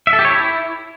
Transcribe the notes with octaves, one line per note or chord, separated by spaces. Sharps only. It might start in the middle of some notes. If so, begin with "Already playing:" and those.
E5
A4
G4
C#5
E4